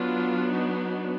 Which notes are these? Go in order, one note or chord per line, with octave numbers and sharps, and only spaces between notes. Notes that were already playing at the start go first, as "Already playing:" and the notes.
Already playing: F#3 B3 D4 F4
D#4